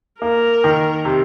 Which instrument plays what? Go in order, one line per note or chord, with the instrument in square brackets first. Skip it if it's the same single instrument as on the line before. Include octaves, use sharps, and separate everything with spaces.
[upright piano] A#3 [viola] A#4
[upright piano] D#3
C3